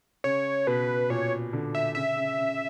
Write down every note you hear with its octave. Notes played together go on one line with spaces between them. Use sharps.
C#3 C#5
B2 B4
A#2 C#5
D3
E5
C#3 E5
C#3
C#3